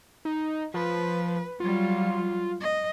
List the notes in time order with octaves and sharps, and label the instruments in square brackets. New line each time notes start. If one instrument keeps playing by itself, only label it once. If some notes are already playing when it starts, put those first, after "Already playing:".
[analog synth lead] D#4
[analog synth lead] F3 [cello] B4
[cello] F#3 G3 [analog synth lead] F4
[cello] D#5